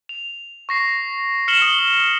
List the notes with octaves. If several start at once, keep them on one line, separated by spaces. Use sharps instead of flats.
F7
C#6 A#6 C7
F6 C#7 E7 F#7 G7
D#6 G7